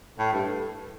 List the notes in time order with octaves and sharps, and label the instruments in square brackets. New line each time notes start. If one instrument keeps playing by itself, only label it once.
[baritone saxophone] A2 [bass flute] A4
[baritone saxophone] G2